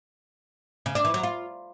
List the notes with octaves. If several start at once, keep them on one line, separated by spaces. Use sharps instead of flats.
C#3
D4
E3
F#3
F4